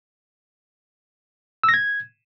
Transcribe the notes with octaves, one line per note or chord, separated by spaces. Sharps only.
E6
A#6
G#6